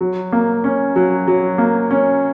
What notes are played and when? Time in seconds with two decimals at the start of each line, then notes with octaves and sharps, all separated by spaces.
0.01 F#3
0.33 A#3
0.64 C#4
0.96 F#3
1.28 F#3
1.58 A#3
1.91 C#4